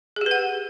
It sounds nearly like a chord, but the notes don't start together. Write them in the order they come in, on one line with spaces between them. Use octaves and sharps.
G#4 G4 B4 F#5